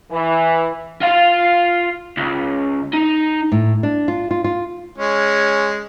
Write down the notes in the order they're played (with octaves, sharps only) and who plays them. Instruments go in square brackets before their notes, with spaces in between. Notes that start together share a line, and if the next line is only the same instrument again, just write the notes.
[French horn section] E3
[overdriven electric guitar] F4 F5
C#2
D#4
[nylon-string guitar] A2
D4
F4
F4
F4
[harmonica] G#3 C#4